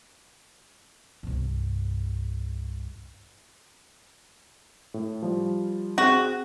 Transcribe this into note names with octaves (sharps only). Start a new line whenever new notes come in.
C2 G2
A2
F3 G3
C4 F#4 G#4